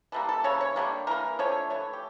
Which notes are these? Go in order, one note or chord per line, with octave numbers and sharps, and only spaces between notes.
E3 G3 A#3 A4
A4
C#3 E3 A#3 C#5
C#5
D3 G3 A#3
E3 A#3 A#4
D3 F3 A3 C#5
E3 A3 C#5
G4